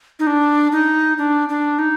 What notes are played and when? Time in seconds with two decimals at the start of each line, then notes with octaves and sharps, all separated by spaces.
0.19 D#4
0.27 D4
0.72 D#4
1.18 D4
1.49 D4
1.79 D#4